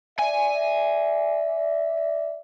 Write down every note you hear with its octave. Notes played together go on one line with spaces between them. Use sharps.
D5 E5 G#5